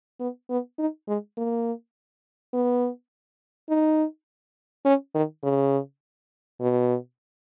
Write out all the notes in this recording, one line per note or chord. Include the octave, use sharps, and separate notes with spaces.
B3
B3
D#4
G#3
A#3
B3
D#4
C#4
D#3
C#3
B2